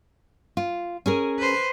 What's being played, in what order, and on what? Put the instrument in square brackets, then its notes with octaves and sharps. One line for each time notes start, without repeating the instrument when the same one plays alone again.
[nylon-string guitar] F4
C#4 G#4 A#4
[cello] B4 C5